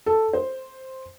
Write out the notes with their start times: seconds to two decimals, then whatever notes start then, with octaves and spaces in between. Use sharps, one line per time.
0.06 A4
0.33 C5